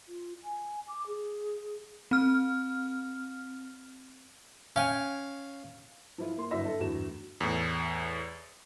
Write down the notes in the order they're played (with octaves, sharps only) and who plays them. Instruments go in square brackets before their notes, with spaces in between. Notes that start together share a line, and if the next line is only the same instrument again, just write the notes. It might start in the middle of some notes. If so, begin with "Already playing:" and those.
[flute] F4
G#5
D6
G#4
[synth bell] C4 F6
[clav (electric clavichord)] C#4 G5 G#5 [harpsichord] F5
[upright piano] F3 E4 F4
A#3 C6
G1 F#3 E4 E5 A#6
A4
G1 E2 A2 F#4 E7
[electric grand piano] E2 A2